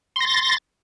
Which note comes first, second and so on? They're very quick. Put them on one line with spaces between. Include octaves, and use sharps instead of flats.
C6 A#6 A6